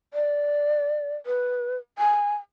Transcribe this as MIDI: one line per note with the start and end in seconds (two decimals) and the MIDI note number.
0.14 1.16 74
1.26 1.76 71
1.98 2.36 80